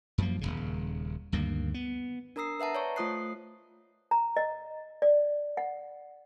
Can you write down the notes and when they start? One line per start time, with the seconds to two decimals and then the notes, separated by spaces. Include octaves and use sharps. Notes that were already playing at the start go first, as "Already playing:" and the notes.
0.18 F#2 F3 A#3
0.41 D#1 G#1 C#3
1.32 D2 G2 D#3 A#3
1.74 B3
2.36 D4 A#4 A#5 D#6 E6 C7
2.60 B4 E5 F#5 A5 A#5
2.75 C#5 D5 A5 C#6
2.96 A3 F4 C5 D#6 F#6 C7
4.11 A#5
4.37 D#5
5.02 D5
5.57 F#5